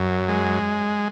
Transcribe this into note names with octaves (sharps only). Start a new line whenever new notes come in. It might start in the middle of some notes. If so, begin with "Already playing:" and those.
Already playing: F#2
G#3